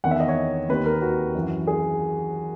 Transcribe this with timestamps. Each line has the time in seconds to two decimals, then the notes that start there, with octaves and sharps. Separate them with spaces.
0.04 E2 D#3 F#5
0.11 E5
0.20 D#5
0.28 C#5
0.69 D#2 D#3 B4
0.86 A#4
1.02 F#4
1.35 F#2 E3
1.67 G#4